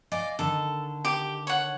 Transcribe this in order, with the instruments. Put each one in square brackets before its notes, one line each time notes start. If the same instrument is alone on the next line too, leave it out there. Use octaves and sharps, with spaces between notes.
[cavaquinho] D5 [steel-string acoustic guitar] D#5 F5 G#5
[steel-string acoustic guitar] D3 D#3 [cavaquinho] A4
[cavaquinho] G4 D6
C#5 F#5